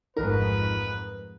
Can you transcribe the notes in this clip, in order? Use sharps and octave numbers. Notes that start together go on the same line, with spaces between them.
A1 F2 G#2 D#4 A#4 B4